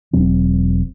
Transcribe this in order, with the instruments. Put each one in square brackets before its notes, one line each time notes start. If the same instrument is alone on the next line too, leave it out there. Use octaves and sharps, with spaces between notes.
[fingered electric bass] E1 F#3 C4